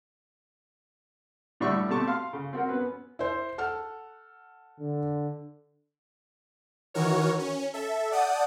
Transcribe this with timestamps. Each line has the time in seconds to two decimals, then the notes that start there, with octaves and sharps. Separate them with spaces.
1.60 A2 D3 G3 E5 C#6
1.88 B2 A3 C4 G4 A5 C#6
2.08 F5 C6
2.33 C#3
2.53 C4 F#4 A#4
2.69 B3 C#4 B4
3.19 E4 C5
3.58 A4 F#5 F6
4.80 D3
6.94 D#3 E3 F#4 A#4 C#5
7.39 C#4
7.74 A4 E5
8.12 D5 F#5 A5 D#6 G6